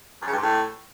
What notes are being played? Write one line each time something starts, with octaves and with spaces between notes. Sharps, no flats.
F#2
C#3
G2
G#2
A2